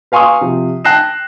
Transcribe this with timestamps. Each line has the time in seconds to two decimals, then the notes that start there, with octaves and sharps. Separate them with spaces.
0.12 B4 F5 G#5 C6 C#6 D#6
0.41 C3 F3
0.85 G5 A5 F#6 A#6 C7 E7